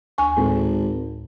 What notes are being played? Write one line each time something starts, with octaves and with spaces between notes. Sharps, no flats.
D2 G#5 C#6
G#1 A2